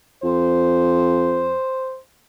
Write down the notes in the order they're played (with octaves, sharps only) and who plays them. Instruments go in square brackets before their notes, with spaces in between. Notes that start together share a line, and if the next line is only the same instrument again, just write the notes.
[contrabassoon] F2 [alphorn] C5